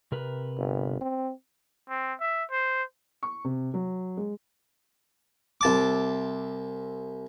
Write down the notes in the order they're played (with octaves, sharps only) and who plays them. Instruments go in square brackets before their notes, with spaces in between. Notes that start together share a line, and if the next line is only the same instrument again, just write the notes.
[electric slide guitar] C3 A#4 B4
[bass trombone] G1
C4
[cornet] C4
E5
C5
[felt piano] C#6
C3
F#3
G#3
[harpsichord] C2 A5 D6